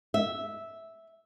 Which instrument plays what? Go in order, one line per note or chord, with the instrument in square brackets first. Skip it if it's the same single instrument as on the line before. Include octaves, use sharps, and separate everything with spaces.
[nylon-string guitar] E5